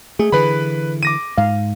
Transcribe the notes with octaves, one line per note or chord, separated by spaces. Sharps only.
A3 G#4
D3 E3 B4 B5
D6 A#6 D#7
G#2 F5